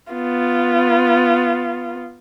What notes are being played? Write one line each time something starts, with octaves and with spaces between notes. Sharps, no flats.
B3 F4